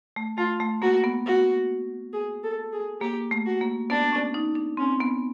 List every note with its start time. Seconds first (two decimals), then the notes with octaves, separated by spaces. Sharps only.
0.16 A3
0.37 A3 F4
0.60 A3
0.82 A#3 F#4
1.04 B3
1.26 F#4
2.13 G#4
2.44 A4
2.73 G#4
3.01 A#3 G4
3.31 A3
3.46 F#4
3.61 A#3
3.90 B3 D4
4.12 C#4
4.34 D#4
4.55 D4
4.77 C4 C#4
5.01 B3